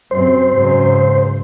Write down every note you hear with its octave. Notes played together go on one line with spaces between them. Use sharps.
F#2 C3 C4 C5
G#2 C#3 F#3